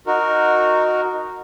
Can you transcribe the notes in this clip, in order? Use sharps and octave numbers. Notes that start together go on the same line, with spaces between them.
D#4 F#4 A#4